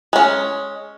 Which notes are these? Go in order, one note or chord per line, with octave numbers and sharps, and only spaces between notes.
G#3 C#4